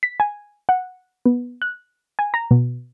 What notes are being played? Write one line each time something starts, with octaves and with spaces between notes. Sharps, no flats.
B6
G#5
F#5
B3
F#6
G#5
A#5
B2